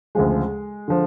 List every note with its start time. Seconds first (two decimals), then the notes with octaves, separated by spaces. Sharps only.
0.15 D2 C#3 F3 G#3
0.88 D3 F3